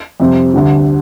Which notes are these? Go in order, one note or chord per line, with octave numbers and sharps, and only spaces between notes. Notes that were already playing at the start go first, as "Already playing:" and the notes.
F2 C3 G3 C4
D2 D3 G3